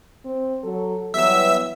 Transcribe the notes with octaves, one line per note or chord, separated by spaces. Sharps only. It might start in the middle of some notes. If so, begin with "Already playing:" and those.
C4
F#3 A4
E3 F#3 G3 B3 E5 E6